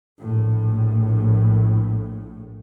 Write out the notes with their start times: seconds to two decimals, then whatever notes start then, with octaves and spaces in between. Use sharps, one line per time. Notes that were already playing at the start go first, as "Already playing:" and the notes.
0.18 A#1 A2